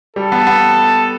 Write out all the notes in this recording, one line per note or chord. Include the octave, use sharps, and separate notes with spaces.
G3 A4
B3
B3